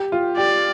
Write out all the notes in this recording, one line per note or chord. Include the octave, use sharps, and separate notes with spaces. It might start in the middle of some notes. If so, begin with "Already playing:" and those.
Already playing: G4
F4
G4 D5